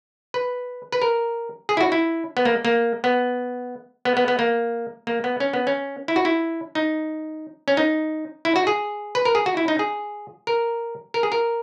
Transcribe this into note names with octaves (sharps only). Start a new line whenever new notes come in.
B4
B4
A#4
G#4
E4
F#4
E4
B3
A#3
A#3
B3
B3
B3
B3
A#3
A#3
B3
C#4
B3
C#4
E4
F#4
E4
D#4
C#4
D#4
E4
F#4
G#4
B4
A#4
G#4
F#4
E4
D#4
G#4
A#4
A#4
G#4
A#4